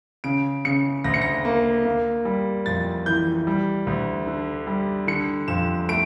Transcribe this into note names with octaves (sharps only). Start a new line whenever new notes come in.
C#3 D7
C#3 C#7
D2 A#6
C#7
A#6
A#3
A#3
G3
F2 A6
E3 G6
G3
D2
D3
G3
D3 C#7
F2 E7
A3 D7